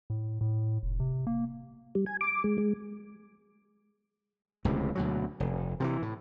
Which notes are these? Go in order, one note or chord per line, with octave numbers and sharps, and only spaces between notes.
A2
A2
F1
C3
A#3
G3
G#5
D6
G#3
G#3
D1 C#2 A2 C3
D2 B2 F#3
F1
C3 D#3 E3
A2